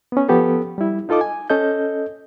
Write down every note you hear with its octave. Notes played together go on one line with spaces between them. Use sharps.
B3 C#4
F3 B3 G4 A4
G3 E4
D#4 F4 A4 D#5 D6
G#5
C#4 A4 D#5 G6